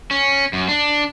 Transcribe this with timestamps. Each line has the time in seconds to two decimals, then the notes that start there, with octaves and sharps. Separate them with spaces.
0.11 C#4
0.53 F#2
0.68 D4